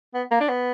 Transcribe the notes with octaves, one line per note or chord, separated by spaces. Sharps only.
B3
A#3
D4
B3